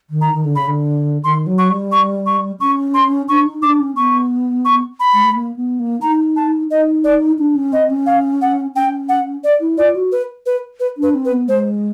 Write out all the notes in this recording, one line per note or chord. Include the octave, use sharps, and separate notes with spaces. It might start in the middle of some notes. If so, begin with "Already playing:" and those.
D#3
A#5
D#3
D3
C#3 B5
D3
D#3 C6
F#3
C#6
G3
C#6
C#6
C#4 C#6
C6
D4 C#6
D#4
D4 D6
C#4
B3 C#6
C#6
B5
G#3
A3
A#3
B3
A#3
D#4 A#5
A5
D#4 D#5
D5
D4
C#4
C4 D#5
C#4
F5
F#5
C#4 G5
F#5
D5
E4
F4 D5
F#4
B4
B4
B4
D4
B4
C4
B4
B3
G#3 C5